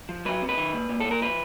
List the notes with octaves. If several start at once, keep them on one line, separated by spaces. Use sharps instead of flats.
F3
F#3 B4
C3
B4
D#3
A#2
A#2
A#2 A4
A#4
F3 B4